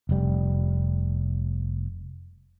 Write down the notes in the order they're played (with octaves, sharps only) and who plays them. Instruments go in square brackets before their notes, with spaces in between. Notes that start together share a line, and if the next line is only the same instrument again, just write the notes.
[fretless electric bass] F1 G3